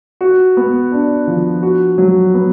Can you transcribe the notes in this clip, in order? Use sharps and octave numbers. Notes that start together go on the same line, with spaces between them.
F#4
B3
D4
F3
F#4
F#3
B3